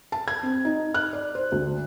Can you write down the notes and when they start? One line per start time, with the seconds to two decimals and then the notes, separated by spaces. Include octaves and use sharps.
0.12 A5
0.28 G#6
0.43 C4
0.65 D#4
0.94 F#6
1.13 D5
1.35 C5
1.52 D2